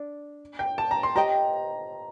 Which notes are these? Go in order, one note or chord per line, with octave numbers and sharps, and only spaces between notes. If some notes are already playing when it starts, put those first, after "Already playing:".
Already playing: D4 D5
G5
A5
A#5
C6
G4 C5 D#5 G5 A#5